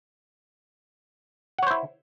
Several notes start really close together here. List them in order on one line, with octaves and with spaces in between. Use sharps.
F#5 C#5 C5 E4